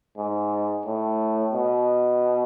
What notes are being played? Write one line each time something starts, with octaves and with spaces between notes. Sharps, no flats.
G#2
A2
B2